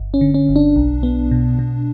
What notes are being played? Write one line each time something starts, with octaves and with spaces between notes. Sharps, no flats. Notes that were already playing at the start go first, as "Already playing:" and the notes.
Already playing: G1
C#4
D3
C#4
G1
D4
B1
B3
B2
B2